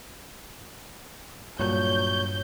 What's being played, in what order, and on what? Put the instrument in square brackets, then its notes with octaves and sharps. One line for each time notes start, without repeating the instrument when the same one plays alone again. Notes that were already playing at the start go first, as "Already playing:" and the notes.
[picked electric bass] G2 [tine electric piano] A#2 F#3 [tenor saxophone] C#5 [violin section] G6